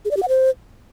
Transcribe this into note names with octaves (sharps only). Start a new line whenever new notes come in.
G#4
D5
G4
F#5
C5